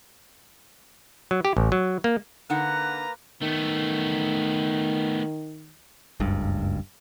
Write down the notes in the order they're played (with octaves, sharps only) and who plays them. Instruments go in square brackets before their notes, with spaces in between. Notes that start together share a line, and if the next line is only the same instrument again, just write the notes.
[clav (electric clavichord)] F#3
G4
A1
F#3
A#3
[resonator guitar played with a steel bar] D3 D#4 F#5 [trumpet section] A#3 B4 A#5 [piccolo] F#6
[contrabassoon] D#3 [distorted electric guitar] A3 B3
[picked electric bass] F#1 C#2 G2